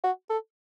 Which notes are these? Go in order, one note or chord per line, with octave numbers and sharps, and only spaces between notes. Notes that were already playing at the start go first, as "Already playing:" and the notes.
F#4
A4